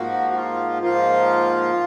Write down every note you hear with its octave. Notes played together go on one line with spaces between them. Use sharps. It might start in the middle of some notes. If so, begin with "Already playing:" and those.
Already playing: G#2 F3 A#3 F#4
F#4
F4
G#2 F3 A#3 F4